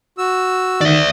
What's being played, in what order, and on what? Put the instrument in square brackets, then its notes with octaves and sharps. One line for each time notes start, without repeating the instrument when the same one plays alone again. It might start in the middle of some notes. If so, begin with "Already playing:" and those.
[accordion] F#4 E6
[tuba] D#3 [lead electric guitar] D5 E5